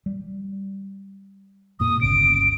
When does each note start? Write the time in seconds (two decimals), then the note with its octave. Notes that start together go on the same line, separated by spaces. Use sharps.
0.06 G3
1.80 F2 A#2 A#3 D#6
2.01 G1 C#2 C#3 D7